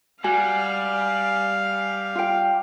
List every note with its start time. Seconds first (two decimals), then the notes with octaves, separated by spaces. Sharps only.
0.24 G3 F#4 F5 G#5
2.15 F4 G5